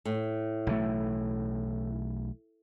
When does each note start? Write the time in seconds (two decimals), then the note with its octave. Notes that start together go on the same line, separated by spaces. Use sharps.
0.05 A2
0.67 B1 E3 A3